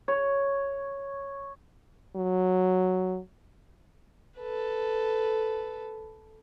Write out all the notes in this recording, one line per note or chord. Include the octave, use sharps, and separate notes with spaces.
C#5
F#3
A4 B4